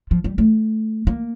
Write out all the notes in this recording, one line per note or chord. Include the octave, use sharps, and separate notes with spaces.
F3
G3
A3
A#3